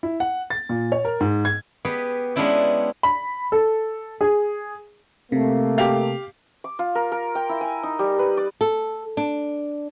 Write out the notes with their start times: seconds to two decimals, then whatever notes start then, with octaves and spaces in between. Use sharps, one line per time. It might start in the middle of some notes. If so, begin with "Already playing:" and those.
0.03 E4
0.20 F#5
0.50 A6
0.69 A#2
0.92 C#5
1.05 A#4
1.20 G#2
1.45 G#6
1.85 B3 G4 G#4 B4
2.36 G#3 B3 C#4 D4 E4 G4
3.03 B5
3.52 A4
4.21 G#4
5.32 C3 A3 A#3
5.78 G4 F5
6.64 D6
6.79 F4
6.95 A#4
7.12 A#4
7.35 G5
7.49 E4
7.61 G#5
7.83 D#4
7.99 G3
8.19 B4
8.37 D5
8.61 A4
9.17 D4